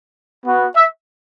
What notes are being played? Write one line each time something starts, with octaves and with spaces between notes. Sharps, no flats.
B3 F#4
E5